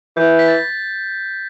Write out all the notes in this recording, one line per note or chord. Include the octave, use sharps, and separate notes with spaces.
E3 G6
B6
A6